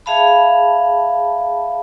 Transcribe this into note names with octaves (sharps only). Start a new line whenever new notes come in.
G#4 E5 F5 A5 B5